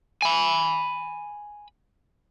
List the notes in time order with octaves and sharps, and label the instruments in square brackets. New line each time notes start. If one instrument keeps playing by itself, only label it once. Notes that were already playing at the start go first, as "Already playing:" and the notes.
[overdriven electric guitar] G#5 B5